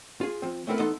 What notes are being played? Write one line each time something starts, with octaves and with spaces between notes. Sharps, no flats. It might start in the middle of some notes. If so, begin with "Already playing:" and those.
F4 G#4
F3 C4
A3 B3 C4 E4 A4 A#4
E3 B3 D#4 A4 A5 C6